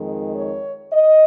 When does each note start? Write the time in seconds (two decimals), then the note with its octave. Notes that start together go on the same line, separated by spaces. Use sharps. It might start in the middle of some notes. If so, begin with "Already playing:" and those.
Already playing: F2 D#3 G#3
0.36 C#5
0.92 D#5